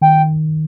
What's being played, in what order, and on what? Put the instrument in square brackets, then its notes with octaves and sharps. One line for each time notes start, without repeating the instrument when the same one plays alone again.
[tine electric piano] D#3 [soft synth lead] G5